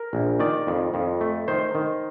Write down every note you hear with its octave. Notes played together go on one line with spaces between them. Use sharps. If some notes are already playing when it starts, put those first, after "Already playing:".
Already playing: A#4
A#1
D#3 D5
F2
F2
A3
D#3 C5
D#3